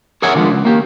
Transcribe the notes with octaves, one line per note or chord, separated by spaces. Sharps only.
G#4 A#4 C#5 E5 F#5 G#5
D3 D#3 F3 G#3 B3
C#2
A#3 G4